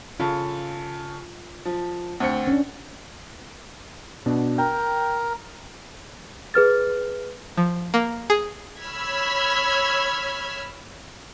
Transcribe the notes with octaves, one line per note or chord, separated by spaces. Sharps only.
C#3 F4 A4
F3
D2 C4 C#7
C#4 D4
B2 D4 F#4
A#4 G5
G#4 B4 F6 A6
F3
A#3
G#4
C#5 B5 E6 F6 G#6 B6